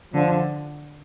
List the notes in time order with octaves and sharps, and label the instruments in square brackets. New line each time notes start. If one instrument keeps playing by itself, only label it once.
[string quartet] D3 [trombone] F3